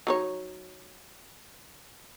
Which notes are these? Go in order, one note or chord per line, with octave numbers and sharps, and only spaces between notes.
F#3 D#4 C#5